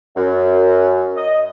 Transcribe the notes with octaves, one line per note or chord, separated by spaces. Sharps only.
F#2
D#5